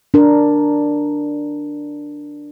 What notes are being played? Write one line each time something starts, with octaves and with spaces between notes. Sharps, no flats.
D4 A#4